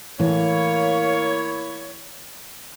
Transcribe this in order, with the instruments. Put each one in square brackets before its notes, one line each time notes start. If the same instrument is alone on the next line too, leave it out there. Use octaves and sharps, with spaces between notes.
[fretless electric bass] A2 E3 [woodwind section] A#3 E4 C#5